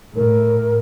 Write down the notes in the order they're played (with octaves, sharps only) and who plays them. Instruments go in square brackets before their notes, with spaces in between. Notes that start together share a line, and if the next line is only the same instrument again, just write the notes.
[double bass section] A2 [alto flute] A#4